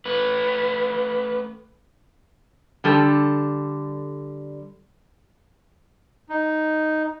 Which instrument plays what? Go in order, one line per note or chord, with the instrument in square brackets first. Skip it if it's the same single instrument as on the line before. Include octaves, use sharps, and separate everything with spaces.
[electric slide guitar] A3 B4
[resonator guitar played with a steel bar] D3 G3 A4
[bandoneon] D#4